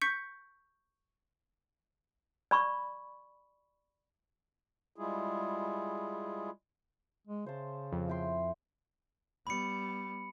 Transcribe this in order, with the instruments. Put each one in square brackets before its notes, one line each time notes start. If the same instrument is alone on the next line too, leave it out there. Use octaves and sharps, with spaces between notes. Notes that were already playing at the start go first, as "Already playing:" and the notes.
[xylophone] C#6 G6 B6 C#7
[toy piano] D5 B5 C#6
[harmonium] G3 G#3 E4 F4 G#4
[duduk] G#3
[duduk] C#3 [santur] C5 A5
[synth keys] F2
[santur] E4 G5 C6
[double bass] G3 B3 [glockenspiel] B5 C#7